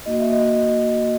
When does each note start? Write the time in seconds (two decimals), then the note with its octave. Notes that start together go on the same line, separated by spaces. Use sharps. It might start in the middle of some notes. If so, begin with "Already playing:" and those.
0.06 A#3 D#4 F#4 D#5
0.20 E5
0.32 D#5